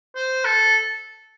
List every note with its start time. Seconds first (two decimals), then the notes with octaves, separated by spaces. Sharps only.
0.16 C5
0.45 A4